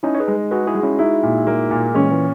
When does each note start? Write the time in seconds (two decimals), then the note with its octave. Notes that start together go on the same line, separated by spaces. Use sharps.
0.03 C#4 D#4 E4
0.15 C#5
0.20 G#4 B4
0.28 G#3
0.51 F#4 G#4 B4
0.67 E4 G#4
0.75 G#3
0.83 C#4 E4
0.99 D#4 E4 F#4
1.23 A#2
1.47 A#3
1.71 A#2
1.94 E3 G#3 C#4
2.11 E3